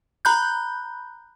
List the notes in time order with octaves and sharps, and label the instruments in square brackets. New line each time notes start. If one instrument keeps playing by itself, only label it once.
[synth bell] A#5 B5 F#6 G6